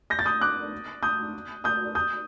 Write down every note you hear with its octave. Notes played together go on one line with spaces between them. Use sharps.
G6 A#6
A6
D#6 G6
D6 F#6
D#6 G6
D#6 G6
D#6 G6